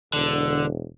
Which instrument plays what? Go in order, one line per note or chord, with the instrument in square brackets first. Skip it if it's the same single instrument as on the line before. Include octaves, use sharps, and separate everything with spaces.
[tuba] E1 [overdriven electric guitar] D3